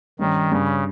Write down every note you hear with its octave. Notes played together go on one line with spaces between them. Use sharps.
G2 D#3 G3 C#4
G2 C#3 G3 C#4